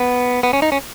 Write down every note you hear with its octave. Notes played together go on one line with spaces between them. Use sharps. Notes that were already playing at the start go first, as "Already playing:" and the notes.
Already playing: B3
B3
C#4
D#4
C#4